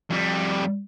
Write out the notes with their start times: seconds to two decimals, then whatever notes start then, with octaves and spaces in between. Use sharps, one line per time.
0.10 F2 G3